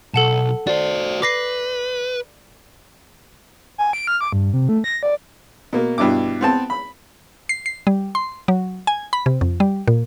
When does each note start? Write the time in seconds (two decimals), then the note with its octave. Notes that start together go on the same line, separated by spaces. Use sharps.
0.14 B1 A4 F#5 A5
0.67 F#4 C5 D5
1.22 B4 D6 A#6 C7
3.78 G#5
3.93 D7
4.07 F6
4.21 D6
4.33 G2
4.53 C3
4.69 A3
4.84 A#6
5.03 D5
5.73 B2 A#3
5.98 G2 B2 E4 D6
6.41 B3 C4 A5
6.70 B5
7.49 C7
7.66 C7
7.87 G3
8.15 C6
8.48 F#3
8.87 G#5
9.13 B5
9.26 C3
9.41 F2
9.60 G3
9.88 A#2